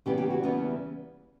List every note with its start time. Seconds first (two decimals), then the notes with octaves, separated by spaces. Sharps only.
0.06 E2 C#3 E3 G3 B3 G4
0.18 G4
0.30 F#4
0.43 E2 C#3 E3 G3 B3